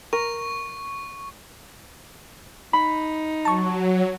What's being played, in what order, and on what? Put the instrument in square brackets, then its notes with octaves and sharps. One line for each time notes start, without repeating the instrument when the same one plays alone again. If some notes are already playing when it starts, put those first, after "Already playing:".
[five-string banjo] A#4 [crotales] C#6
[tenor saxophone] D#4 [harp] B5
[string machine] F#3 [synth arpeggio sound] A5 C#6